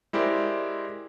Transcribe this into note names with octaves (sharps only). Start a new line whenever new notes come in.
G#3 E4 G4 A#4 C5 D5